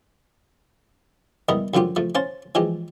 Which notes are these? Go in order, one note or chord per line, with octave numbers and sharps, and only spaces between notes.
G3 B3 E4 A#4 D#5
F#2 D3 F3 F4 G4
F3 A3
C#4 C5 F5 A5
E3 F3 G#3 G4